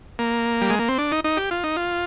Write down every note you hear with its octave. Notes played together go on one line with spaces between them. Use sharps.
A#3
G3
G#3
A#3
C4
D4
D#4
D#4
G4
F4
D#4
F4